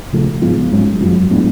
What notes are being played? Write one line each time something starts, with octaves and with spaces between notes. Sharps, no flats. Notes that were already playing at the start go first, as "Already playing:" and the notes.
C#3 F3 A3
G#2 F3 G#3 B3
G#2 F#3 C#4
F#2 F3 G#3
A2 G#3 B3 D4